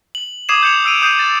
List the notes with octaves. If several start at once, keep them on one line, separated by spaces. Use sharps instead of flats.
F#7
D6 D#6 G#6 C7 D#7 E7
G6 G#6 C#7 F7 F#7
E6 C7 D7 D#7 F7
D#6 G6 C7 D#7 E7
A6